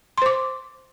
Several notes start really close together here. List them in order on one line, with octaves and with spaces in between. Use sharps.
C6 C5 D6